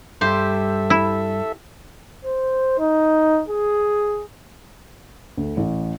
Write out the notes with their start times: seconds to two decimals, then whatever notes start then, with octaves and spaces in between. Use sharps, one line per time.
0.21 G2 G3 G4 A4 C5 E5
0.90 E4
2.25 C5
2.79 D#4
3.49 G#4
5.37 D2
5.57 A1